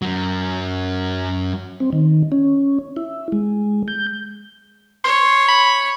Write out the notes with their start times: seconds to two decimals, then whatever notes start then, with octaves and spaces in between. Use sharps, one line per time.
0.02 F#2 F#3
1.80 C4
1.93 D#3
2.32 C#4
2.97 E4
3.32 G#3
3.88 G6
5.04 C#5 C6
5.48 B5